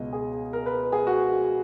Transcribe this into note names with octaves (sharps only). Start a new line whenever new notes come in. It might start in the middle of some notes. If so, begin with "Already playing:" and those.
Already playing: C#2 B2 D#5
G#4
A#4
B4
G#4
F#4